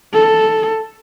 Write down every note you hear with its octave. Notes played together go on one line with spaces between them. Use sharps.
A4